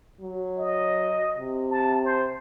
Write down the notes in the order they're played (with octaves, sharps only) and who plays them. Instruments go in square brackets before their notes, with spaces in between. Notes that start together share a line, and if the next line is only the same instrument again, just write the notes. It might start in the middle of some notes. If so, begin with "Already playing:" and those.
[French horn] F#3
[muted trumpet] D#5
[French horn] C3
[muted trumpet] A5
C5